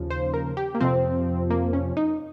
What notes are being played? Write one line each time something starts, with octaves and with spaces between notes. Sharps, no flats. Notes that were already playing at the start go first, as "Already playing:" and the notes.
Already playing: D#2 C#3 F3
C5
A#4
G4
A#3
F2 C3 F3 C4
A#3
C#4
D#4